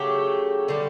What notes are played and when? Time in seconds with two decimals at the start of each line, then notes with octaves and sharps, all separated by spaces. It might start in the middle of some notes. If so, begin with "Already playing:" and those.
Already playing: C#3 F#3 A3 G4
0.68 D3 G3